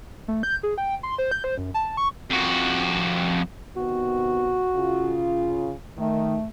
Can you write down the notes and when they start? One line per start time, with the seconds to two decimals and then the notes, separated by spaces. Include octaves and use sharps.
0.28 A3
0.43 G6
0.63 G#4
0.78 G5
1.03 C6
1.18 C5
1.31 G6
1.44 C5
1.58 F#2
1.74 A5
1.97 C#6
2.30 F2 F#4
3.76 C3 D#3 B3 F#4
4.75 C#3 F4
5.98 D#3 A3